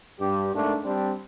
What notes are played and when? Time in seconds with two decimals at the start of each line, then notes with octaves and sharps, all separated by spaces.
0.20 G2 G4
0.54 G#2 A3 A#3 D4
0.84 G3 C4 D4